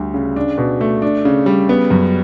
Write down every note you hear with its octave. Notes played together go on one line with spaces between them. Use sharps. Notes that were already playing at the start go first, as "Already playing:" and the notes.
Already playing: D2 G3
C#3
D4
B2
A3
D4
C#3
G3
B3
F#2